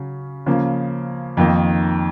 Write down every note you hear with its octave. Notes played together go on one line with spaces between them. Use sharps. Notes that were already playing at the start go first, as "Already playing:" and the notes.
Already playing: C#3 F#3 C#4
C#3 F3 A#3
F2 D#3 A#3 D#4